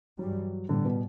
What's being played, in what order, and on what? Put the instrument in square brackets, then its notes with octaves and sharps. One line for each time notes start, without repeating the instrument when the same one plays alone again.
[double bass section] G2 E3 G3 [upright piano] F#3
[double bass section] A2 G3 B3 [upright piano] D3
[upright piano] B2